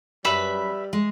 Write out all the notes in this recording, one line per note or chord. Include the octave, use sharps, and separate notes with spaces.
F#2 G3 B4 E5 B5
G#3